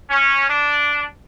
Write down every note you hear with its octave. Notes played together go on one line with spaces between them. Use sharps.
C#4
D4